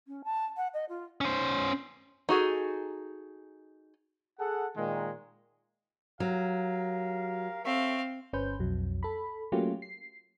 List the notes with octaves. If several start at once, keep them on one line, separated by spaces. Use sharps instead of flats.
C#4
A5
F#5
D#5
F4
C#4 C5
D#4 F#4 G#4 A4
G#4 A4 F#5
A#2 D#3 G#3
F#3 G4 A#4 F5
C4 A4 C#5 E5 F5
G1 C#4 B4 C5 G6
B1 F2 F#3
A4 B5
F#3 A3 A#3 C#4 F4 G4
C7